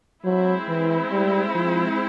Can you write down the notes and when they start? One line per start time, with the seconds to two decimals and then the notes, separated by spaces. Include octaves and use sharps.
0.25 F#3 G#3 C4 E4
0.68 E3
1.12 G3
1.55 F3